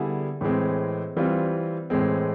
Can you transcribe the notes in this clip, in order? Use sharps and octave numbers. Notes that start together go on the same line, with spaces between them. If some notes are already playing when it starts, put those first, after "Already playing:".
Already playing: D3 G3 B3 E4 G#4
A2 E3 G#3 C4
E3 G3 C4 F4
A2 E3 G#3 C4